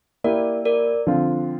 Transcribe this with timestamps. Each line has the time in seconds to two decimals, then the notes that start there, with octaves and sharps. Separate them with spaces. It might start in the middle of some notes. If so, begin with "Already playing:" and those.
0.24 A#3 E4 G4 A#4 D5
0.65 A#4 D5
1.07 D3 F3 C4 F4